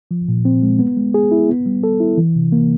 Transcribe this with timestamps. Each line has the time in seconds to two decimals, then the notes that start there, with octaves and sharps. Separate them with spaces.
0.11 F3
0.28 A#2
0.45 C4
0.63 G#3
0.79 B3
0.97 G#3
1.14 G#4
1.31 E4
1.49 B3
1.66 G3
1.84 A4
2.00 E4
2.18 E3
2.35 C3
2.52 A#3